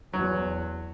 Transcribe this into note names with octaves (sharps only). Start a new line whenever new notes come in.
E2 F#3